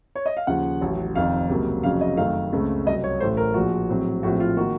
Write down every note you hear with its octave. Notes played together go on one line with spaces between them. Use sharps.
C#5
D#5
F5
D#2 C#3 F3 F#5
A1 A2 F#3
F1 F2 D#3 F5
C#2 C3 F#3 A#3
F1 F2 C#3 F#3 F5
D#5
F#2 D#3 A3 C4 F5
C#2 C#3 A3 C4
C2 C3 F#3 D#5
C#5
A1 A2 A3 C5
A#4
A#1 A#2 F3 F#4
A#1 A2 F#3 C4
A#1 A2 F3 C4 F#4
F4
D#3 A#3 F#4